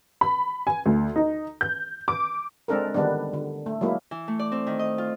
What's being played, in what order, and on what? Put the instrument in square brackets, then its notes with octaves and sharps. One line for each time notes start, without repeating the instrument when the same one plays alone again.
[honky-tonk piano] B5
G#5
D2
D#4
G6
D6
[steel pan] G#3 C4 D4 A4 A#4
D3 D#3 G3 B3 D4
D3
A3
F#3 G#3 A#3 E4
[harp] E3
A3
D5
C4
D#3
D#5
F4